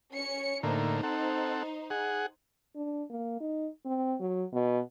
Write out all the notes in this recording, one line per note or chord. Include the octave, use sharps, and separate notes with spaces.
C#4 C#7
A2 D3 A#3 D#4 C5
C4 A4 F#5
G#4 F#5
D4
A#3
D#4
C4
F#3
B2